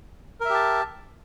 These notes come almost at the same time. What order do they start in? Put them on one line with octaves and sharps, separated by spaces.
A#4 E5 G4 A5